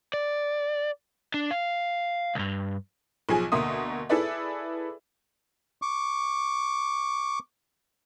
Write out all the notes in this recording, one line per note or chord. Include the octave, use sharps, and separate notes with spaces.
D5
D4
F5
C2 G2
B1 F3 G#4 G#5
D2 B2 A#3 E5 C6 D#6
E4 G#4 A4 B4 D5 E5
C#6 D6